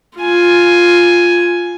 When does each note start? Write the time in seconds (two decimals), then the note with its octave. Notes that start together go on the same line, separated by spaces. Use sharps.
0.18 F4 G#5